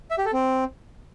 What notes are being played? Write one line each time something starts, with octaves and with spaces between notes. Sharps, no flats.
E5
G4
A4
C4